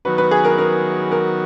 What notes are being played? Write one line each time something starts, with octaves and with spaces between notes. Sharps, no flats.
D#3 F#3 B3 F#4 B4
B4
G#4
A#4
A#4
A#4